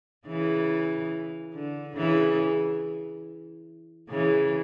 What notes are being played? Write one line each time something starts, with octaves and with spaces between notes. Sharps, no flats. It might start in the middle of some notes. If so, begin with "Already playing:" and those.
C#3 E3
D3
C#3 E3
C#3 E3